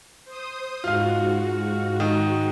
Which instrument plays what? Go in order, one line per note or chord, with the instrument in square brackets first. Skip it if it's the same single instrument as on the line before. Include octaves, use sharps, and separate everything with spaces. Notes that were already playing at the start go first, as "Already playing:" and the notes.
[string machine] C5 D#6
[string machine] G#2 F#4 [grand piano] F4 F5
[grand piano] D#3